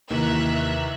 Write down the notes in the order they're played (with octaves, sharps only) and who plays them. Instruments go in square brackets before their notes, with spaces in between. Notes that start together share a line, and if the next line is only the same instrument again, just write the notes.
[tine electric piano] D#2 [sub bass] C3 [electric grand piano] D#3 E3 A#3 [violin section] E5 A#5 F#6